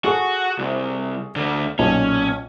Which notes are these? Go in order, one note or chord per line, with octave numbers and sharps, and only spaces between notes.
F#4 G#4 A4 C#6
C2
D2 D3
B1 A#2 C#4